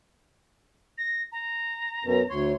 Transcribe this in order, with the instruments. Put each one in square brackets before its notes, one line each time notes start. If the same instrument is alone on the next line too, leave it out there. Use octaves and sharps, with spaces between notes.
[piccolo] A#6
A#5
[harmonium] F#2 B2
[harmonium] D2 C#5 [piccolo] C6